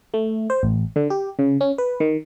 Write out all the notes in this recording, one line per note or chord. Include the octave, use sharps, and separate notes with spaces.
A3
C5
A1
D3
G4
C#3
C#4
B4
D#3